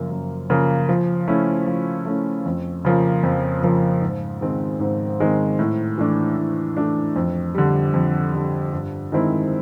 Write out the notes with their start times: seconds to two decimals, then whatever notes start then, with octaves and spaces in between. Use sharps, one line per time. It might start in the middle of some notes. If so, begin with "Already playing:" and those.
Already playing: F#2 C#3 F3 A#3
0.11 F#2
0.50 C#3 F3 A#3
0.89 F3
1.28 A3 C#4 E4
1.67 F3
2.05 A3 C#4 E4
2.46 F2
2.85 C#3 F3 A#3
3.23 F2
3.63 C#3 F3 A#3
4.02 G#2
4.41 D#3 G#3 C4
4.80 G#2
5.20 D#3 G#3 C4
5.59 A2
5.98 E3 A3 D4
6.37 A2
6.77 E3 A3 D4
7.16 F2
7.54 D3 G3
7.94 F2
8.33 D3 G3
8.73 G2
9.12 D#3 G#3 C4 E4